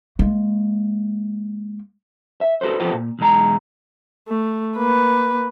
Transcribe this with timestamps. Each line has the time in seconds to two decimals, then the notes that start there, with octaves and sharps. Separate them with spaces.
0.19 G#3 A#3
2.41 E5
2.61 F#4 A4 B4 C5
2.80 F3 B3 F4 G4 A4 C5
2.92 A#2
3.19 B1 E2 G#3 A#5
4.28 A3
4.76 A#3 B4